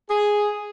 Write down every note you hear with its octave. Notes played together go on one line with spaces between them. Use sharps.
G#4